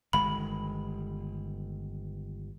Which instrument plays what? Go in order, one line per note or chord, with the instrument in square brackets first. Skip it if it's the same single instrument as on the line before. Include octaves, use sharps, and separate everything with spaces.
[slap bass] G1 D#3 G#3 [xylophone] B5